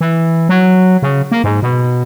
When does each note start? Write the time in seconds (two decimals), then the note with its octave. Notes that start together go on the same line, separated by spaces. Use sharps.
0.01 E3
0.49 F#3
1.02 C#3
1.31 A#3
1.44 G#2
1.62 B2